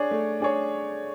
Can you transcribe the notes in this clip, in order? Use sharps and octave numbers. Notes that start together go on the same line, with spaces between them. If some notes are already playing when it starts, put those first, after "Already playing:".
Already playing: D4 G#4 C#5
A3
D4 G#4 C#5